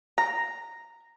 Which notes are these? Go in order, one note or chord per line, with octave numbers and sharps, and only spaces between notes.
A#5